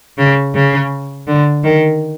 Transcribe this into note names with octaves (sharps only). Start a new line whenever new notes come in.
C#3
C#3
D3
D#3